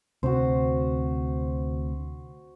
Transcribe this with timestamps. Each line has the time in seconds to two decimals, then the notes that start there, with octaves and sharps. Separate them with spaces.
0.23 D2 C3 C4 F#4 C5